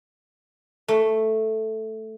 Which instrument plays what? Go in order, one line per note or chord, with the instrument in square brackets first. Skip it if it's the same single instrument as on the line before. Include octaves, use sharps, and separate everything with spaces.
[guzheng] A3